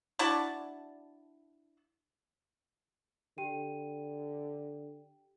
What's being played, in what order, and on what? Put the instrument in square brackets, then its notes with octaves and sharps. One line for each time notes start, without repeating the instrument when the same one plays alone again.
[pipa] D4 E4 F#4 A5
[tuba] D3 [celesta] G4 G5 D#7